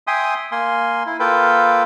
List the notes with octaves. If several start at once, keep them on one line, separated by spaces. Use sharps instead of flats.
E5 G5 G#5 C6 D#6
A#3 G#5 C6
E4
A#3 F4 A4 B4 G5